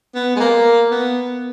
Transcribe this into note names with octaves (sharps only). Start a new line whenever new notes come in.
B3
G#3
A#3
B3